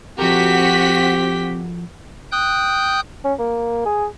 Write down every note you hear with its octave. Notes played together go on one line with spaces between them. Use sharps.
F3 C4 F#4 G4 A4 A#4 B6
G5 D#6 F#6 G6
C#4
A#3
G#4